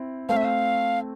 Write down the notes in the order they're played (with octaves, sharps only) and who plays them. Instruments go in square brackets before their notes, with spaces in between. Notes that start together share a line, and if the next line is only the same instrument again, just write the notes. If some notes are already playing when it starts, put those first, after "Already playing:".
Already playing: [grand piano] C4 E4
[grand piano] A3 C4 [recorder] F5
[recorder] E5
F5